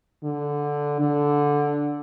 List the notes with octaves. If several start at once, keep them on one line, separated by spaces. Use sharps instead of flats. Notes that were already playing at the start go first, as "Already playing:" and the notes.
D3
D3